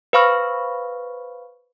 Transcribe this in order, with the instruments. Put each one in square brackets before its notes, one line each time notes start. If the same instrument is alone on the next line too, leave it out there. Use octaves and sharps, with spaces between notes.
[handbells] B4 C5 F5 B5 C#6 F6